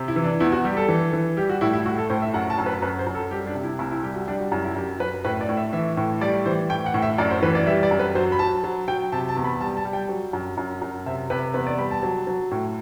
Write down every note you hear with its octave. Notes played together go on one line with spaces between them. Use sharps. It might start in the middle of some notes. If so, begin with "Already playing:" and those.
Already playing: C3
E4
E3
D4
E2 E4
F#4
G3 G4
A4
E3
E3
G3 G4
F#4
A2 E4
E4
A2 F#4
A4
A2 C5
E5
F#2 F#5
A5
F#2
B4
F#2 B4
C5
F#2
A4
G3 G4
D4
C3
E4
C2 E4
E4
G3 G4
F#4
G3 D4
F#4
F#2 E4
E4
F#2 G4
F#2 B4
A2 B4
D5
A2
E5
E3 E5
A2
G3 D5
E3 C5
A2 G5
F#5
A2
E5
F#2 D5
C5
E3 B4
D5
G3 E5
D5
F#2
B4
F#3 C5
B5
F#3 A5
F#3
F#3 G5
C3 A5
A5
E2
B5
G3 A5
A5
G3
G5
F#3
F#2
F#2
F#2
C3 E5
C3 B4
E2 B4
D5
G3 B5
A5
F#3
F#3
A2